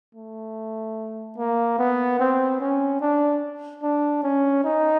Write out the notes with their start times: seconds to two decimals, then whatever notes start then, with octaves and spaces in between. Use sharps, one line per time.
0.15 A3
1.37 A#3
1.78 B3
2.19 C4
2.60 C#4
3.01 D4
3.82 D4
4.23 C#4
4.64 D#4